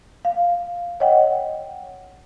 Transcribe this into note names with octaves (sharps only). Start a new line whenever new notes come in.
F5
C#5 D#5 F#5 G5